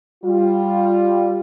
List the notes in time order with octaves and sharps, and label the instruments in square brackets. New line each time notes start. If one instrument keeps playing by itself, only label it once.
[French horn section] G3 F4